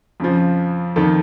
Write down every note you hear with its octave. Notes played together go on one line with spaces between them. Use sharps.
F2 C#3 F3
F2 D#3 A4